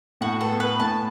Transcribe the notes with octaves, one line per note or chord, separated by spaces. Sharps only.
A2 F#4
B3 A4
B3 B4
A2 A5